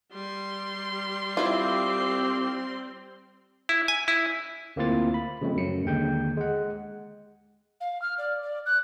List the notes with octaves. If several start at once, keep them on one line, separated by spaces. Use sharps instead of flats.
G3 C6
C4 E4 F4 G4
E4
G#5
E4
D2 A#3 C4 E4 F4 A6
B5
C#3 F3 G#3 A3 C4
F#2 F#3 C#7
D#2 D3 G#3 G5 G6
G#3 F#5
F5
F6
D5
D5
F#6